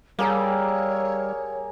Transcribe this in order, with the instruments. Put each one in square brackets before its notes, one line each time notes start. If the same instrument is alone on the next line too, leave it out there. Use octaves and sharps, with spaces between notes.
[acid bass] G3 [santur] A#3 G#4 A#4 [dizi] C#5 [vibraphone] F5 A#5 E6